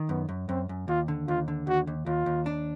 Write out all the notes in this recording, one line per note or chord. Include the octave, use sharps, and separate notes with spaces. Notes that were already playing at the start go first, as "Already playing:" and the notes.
Already playing: D#3
F#2 B3
F#2
F#2 C4
F#2
D#2 F4
D3
D#2 F4
D3
D#2 F#4
D#2
D#2 F4
D#2
D4